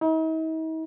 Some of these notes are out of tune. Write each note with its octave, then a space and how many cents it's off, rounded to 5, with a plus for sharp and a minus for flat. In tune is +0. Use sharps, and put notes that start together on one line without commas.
D#4 +45